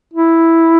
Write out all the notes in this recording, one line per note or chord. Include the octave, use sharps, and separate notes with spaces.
E4